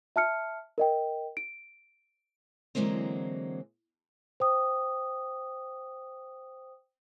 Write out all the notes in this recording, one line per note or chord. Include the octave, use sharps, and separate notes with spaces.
E5 A5 F6 C#7
A#4 D#5 G5
D7
D3 E3 F#3 G#3 A#3 C4
C5 G5 D#6